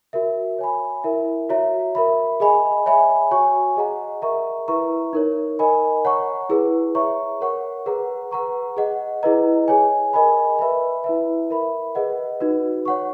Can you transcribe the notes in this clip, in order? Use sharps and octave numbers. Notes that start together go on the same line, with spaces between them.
F#4 A#4 E5
C#5 G#5 B5
E4 A#4 E5
F#4 C#5 E5 A#5
A#4 E5 B5
G#4 D#5 G#5 B5
C#5 E5 G#5 B5
F#4 C#5 G#5 C#6
G#4 D#5 F#5 A#5
A#4 E5 A#5 C#6
E4 B4 E5 A#5 C#6
D#4 A#4 C#5
A#4 D#5 G#5 B5
C#5 F#5 A#5 C#6
E4 G#4 B4
C#5 E5 A#5 C#6
A#4 C#5 F#5 C#6
G#4 B4 F#5 A#5
B4 F#5 A#5 C#6
G#4 D#5 F#5
E4 G#4 B4 D#5 A#5
G#4 C#5 G#5
A#4 D#5 G#5 B5
B4 E5 B5
E4 B4 E5
A#4 E5 B5
G#4 B4 D#5 F#5
D#4 F#4 B4
C#5 F#5 C#6